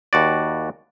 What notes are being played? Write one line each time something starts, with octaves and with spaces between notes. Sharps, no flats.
D#2 F#4 D5